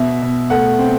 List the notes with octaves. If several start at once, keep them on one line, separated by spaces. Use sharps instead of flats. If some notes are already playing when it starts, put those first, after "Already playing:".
Already playing: B2 E5
B2
A3 F#5
C4